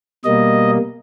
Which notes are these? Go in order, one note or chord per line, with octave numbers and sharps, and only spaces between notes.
B2 G3 A#3 D#5